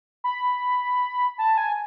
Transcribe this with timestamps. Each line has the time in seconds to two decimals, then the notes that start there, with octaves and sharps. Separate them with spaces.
0.24 B5
1.38 A5
1.57 G#5